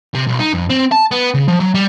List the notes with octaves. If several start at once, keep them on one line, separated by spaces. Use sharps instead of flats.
C3
B1
D#4
F2
C4
A5
B3
C#3
F3
F#3
G3